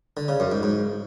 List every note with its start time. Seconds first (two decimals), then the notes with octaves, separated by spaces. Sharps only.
0.17 D3
0.28 C#3
0.40 F#2
0.52 G#2
0.63 G#2